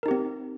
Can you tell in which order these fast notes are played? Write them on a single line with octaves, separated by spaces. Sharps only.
A#4 D#4 G4 C4